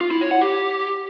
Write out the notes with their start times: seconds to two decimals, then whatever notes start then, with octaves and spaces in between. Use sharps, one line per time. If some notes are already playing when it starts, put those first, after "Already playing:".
0.01 F4
0.11 E4
0.21 C#5
0.31 F#5
0.41 G4